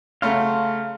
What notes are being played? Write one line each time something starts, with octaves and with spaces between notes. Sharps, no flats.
C#3 F#3 A3 F5 C6